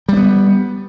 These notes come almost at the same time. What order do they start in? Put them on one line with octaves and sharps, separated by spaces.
G3 C4 B3